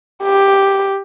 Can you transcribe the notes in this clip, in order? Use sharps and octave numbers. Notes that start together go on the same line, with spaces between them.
G4